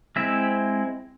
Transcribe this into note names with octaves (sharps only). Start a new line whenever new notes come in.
G#3 C4 E4 E5